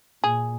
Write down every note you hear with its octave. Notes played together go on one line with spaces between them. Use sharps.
A#2 G#4